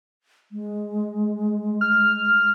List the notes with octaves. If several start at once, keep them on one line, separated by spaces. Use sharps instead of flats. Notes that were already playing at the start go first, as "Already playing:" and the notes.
G#3
F6